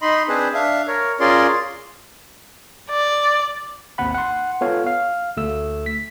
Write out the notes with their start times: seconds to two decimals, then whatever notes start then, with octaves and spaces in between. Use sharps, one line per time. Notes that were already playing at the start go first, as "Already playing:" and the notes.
0.02 D#4 D#5 B5 C6
0.28 C4 D4 G#4 B4 C5
0.54 D4 E5 F5
0.87 A#4 C#5
1.20 C#4 F4 G#4 A#4 D5 C6
2.90 D5
3.98 G#1 D#2 C4 F#5 B5
4.14 F#5 C6
4.61 B3 F4 A4 C#5 F5
4.87 F5
5.37 D2 A3 E6
5.86 B6